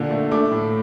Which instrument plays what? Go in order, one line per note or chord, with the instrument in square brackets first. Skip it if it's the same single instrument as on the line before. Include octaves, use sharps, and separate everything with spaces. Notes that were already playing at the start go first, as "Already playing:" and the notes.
Already playing: [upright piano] A#2 D3
A3
A3 D6
A2